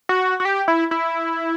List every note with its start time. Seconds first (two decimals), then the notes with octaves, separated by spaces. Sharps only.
0.09 F#4
0.40 F#4
0.45 G4
0.68 E4
0.91 E4